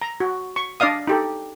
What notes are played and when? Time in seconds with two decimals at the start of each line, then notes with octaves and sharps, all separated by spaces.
0.02 A#5
0.20 F#4
0.56 C#6
0.80 D4 D5 D#5 F5 D#6
1.07 D#4 G4 A4